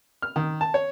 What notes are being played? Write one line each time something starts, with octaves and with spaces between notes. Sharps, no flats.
F6
D#3
A5
C#5